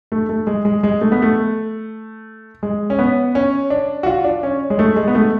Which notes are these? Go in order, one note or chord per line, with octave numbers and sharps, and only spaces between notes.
A3
A3
G#3
G#3
G#3
A3
B3
A3
G#3
C#4
B3
C#4
D4
F#4
F4
D4
C#4
G#3
A3
G#3
B3
A3